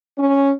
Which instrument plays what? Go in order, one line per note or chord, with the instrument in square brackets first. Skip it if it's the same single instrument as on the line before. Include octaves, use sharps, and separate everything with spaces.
[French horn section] C#4